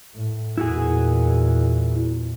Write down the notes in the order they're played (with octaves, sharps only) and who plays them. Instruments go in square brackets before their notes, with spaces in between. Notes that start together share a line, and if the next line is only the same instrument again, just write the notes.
[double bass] A2
[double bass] E2 A#2 [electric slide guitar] E4 F#4 G#4